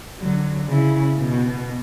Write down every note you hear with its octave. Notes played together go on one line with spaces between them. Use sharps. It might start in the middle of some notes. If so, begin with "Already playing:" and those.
D3 F#3
C#3 E4
B2